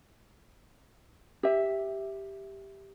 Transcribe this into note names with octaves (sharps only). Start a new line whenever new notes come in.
G4 E5